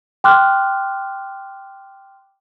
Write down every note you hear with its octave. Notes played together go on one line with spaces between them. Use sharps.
G5 C6 D6 F6 F#6